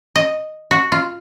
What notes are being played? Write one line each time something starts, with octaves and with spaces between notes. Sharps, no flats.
D#5
F#4
F4